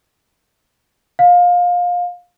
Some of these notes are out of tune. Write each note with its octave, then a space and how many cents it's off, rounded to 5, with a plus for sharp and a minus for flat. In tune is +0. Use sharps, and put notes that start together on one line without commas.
F5 +25